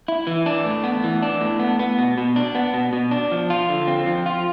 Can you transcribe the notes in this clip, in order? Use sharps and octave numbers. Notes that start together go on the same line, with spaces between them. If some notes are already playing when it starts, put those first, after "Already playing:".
E4
E3
D4
A2
B3
E3
D4
A2
B3
B3
B2
B2
D4
B3
B2
B2
D4
F3
F4
D3
C4
F3
F4